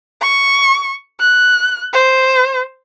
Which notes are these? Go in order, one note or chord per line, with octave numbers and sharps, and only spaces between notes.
C#6
F#6
C5